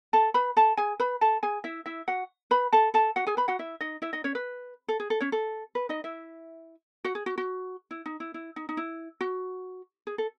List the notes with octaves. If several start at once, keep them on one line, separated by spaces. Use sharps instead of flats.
A4 A5
B4 B5
A4 A5
G#4 G#5
B4 B5
A4 A5
G#4 G#5
E4 E5
E4 E5
F#4 F#5
B4 B5
A4 A5
A4 A5
F#4 F#5
G#4 G#5
B4 B5
F#4 F#5
E4 E5
D#4 D#5
E4 E5
D#4 D#5
C#4 C#5
B4
A4
G#4
A4
C#4 C#5
A4
B4
D#4 D#5
E4 E5
F#4 F#5
G#4
F#4
F#4
E4
D#4
E4
E4
D#4
D#4
E4
F#4
G#4
A4